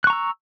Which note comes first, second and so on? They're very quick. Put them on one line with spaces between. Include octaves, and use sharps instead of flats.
F#6 C#6 A#5 E6